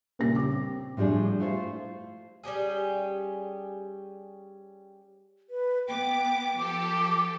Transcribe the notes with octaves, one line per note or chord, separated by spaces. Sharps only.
A#2 C#3 G3 A#6
D6
C4
A2 F3 G3 D4 G#4
A3 E4 F4 C5
G3 C#4 G4 G#4
B4
B3 G5 D6
F3 G4 A4 D6